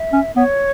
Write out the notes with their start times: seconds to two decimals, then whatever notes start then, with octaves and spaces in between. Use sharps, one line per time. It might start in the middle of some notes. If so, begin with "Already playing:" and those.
Already playing: E5
0.13 C#4
0.36 B3 C#5